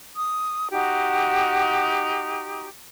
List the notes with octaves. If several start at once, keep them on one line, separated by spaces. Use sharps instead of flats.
D#6
D#4 F#4 G4